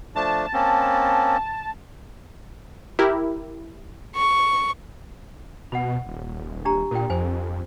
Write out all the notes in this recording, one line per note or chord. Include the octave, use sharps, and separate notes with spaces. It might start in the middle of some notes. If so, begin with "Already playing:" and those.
F3 A3 D4 A5
A#3 C4 C#4
E4 G4 A#4
C#6
B2 F#5 B5
D#1
D4 G4 A#5
A#2 A#4 G5
F2 C5 G#5